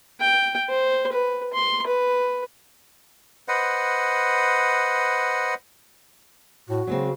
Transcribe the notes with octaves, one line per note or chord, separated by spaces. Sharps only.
G5
C5
B4
C6
B4
B4 C5 D#5 F#5
A2 F#4
C#3 F#3 G#3 C4